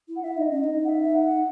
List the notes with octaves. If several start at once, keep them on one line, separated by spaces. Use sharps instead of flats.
E4
F#5
E4 E5
D#4 D#5
C#4 D#5
D#4
F#5
E5
F#5